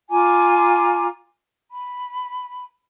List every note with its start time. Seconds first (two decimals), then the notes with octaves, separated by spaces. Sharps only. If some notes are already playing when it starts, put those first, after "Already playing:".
0.09 F4 G#5 A#5 D6
1.70 B5